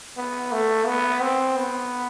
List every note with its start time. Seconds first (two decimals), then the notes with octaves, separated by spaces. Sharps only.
0.17 B3
0.52 A3
0.87 B3
1.22 C4
1.57 B3